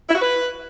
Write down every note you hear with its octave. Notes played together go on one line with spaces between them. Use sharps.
E4
F#4
B4